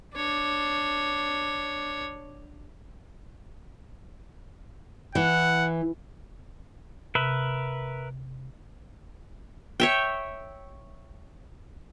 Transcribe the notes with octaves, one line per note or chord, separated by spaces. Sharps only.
D4 C#5
E3 F#5
C3 A#4 B4 E5
C#5 E5 G5